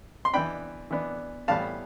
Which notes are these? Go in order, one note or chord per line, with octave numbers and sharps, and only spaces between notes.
C6
E3 B3 D4 G5 B5
E3 B3 D4
A2 E3 G3 B3 F5 A5